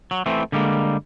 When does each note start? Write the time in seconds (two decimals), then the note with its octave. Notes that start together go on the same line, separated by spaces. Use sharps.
0.11 F#3
0.26 E3 A3 C4
0.52 D3 G3 G#3 A#3